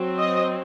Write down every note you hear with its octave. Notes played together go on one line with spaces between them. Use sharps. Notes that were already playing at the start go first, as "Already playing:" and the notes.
Already playing: F#3 C4
D#5